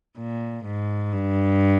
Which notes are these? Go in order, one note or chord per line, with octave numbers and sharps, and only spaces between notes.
A#2
G#2
G2